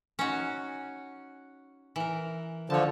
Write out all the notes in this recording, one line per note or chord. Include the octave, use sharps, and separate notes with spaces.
C#4 D#4 F#4
E3 A#4
D3 F3 C#5 A5